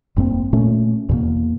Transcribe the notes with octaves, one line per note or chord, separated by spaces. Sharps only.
F1 G2 A#3 C4
A#2 A3 C#4
E2 B2 A#3